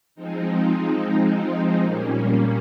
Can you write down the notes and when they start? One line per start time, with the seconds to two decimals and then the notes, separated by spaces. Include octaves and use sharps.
0.15 F3 G#3 C4 D#4
1.80 A#2 G3 A#3 C#4